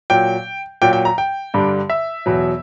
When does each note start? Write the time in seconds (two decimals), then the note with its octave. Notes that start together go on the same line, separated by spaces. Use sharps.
0.10 A#2 F#3 G5
0.82 A#2 F#3 G5
0.93 G5
1.05 A#5
1.18 G5
1.54 G2 D3 G3
1.90 E5
2.26 E2 B2 F#3